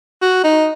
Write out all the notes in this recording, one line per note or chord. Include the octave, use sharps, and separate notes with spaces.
F#4
D#4